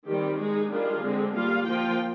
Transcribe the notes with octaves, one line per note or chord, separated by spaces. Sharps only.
D#3 G3 C4 G4
G#3 D#4 G#4
D#3 G3 D4 F4 G#4
D3 G#3 C4
G3 A#3 F4 F5
F3 A#3 F4 G5